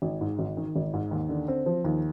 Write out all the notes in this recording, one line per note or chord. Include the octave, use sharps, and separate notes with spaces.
G#1
G#2
G#1
D#3
G#1
G#2
D#2
D3
C4
F3
D#2